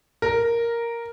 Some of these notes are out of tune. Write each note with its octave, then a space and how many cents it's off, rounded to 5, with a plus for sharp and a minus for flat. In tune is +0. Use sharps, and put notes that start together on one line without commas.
A#4 +0